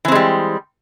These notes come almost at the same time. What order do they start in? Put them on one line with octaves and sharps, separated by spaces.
E3 C4 G#3 G3